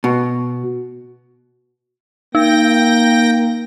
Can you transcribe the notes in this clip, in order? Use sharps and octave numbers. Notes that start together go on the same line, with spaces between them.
B2
A#3 D#4 G5 A#6